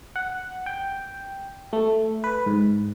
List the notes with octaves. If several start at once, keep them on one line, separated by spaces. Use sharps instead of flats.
F#5
G5
A3
B4
G#2